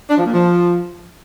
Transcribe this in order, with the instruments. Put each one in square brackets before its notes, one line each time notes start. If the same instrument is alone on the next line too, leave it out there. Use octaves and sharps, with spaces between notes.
[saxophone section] D4
F3
A#2
F3